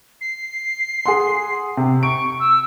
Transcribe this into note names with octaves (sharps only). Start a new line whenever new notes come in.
C7
G#4 F#5 C6
C3
C#6 D7
E6